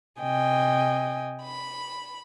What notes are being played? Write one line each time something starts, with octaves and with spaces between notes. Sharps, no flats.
C3 D#5 G5 G#5
B5